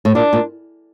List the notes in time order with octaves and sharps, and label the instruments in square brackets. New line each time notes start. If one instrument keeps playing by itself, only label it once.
[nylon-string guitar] A2
[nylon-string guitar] A#2 [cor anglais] D4
[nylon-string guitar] A#2